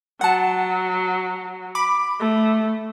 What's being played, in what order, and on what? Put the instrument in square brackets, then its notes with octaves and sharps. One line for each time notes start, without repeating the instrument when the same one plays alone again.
[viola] F#3 [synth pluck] F#5 A5
[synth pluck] B5 D6
[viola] A3